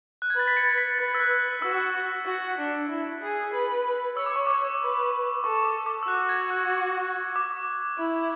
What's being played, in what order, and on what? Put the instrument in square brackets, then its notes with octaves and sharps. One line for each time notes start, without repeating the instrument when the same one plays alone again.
[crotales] F#6
G#6
[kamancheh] B4 [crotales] A6
[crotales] B6
A6 C#7
B6
[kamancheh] B4 [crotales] A6
[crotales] E6
F#6
[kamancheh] B4
[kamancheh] F#4 [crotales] E6
[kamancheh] F#4
D4
E4
G#4
B4
[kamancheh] C#5 [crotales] E6
[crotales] D6
C#6
[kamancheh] C#5 [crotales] D6
[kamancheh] B4
[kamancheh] A4 [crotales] C#6
[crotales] D6
D6
E6
[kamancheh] F#4 [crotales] F#6
[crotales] G#6
F#6
D6
[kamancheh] E4